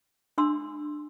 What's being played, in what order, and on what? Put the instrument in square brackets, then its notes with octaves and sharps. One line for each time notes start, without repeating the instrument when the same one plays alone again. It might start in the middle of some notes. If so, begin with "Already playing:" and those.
[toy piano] D4 C6 E6